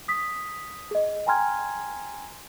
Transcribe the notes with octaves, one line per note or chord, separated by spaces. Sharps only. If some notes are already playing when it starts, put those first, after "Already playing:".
D#6 B6
G#4 D#5
G5 G#5 A#5 C6 F6 G#6